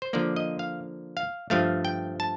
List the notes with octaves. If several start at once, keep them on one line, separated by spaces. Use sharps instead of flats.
C5
D3 F3 A#3 D5
D#5
F5
F5
G2 F3 A3 F5
G5
A5